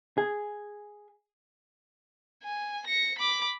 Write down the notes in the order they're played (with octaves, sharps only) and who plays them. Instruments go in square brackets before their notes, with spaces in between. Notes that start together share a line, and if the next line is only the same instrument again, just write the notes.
[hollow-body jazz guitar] G#4
[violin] G#5
A#6 C#7
B5 D6